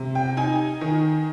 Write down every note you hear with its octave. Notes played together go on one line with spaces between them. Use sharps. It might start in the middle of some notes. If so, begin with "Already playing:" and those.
Already playing: C3
G5
D#4 G#5
D#3